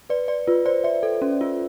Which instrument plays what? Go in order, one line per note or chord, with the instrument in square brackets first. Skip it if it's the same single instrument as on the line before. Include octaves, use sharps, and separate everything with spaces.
[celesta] B4 [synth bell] D5
[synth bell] D5
[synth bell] F4 [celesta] B4
[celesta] C5 [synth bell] D5
[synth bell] D5 [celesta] E5
[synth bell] A4
C#4
F4